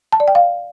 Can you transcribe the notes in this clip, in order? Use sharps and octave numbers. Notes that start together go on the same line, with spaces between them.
A5
D5
G5
F5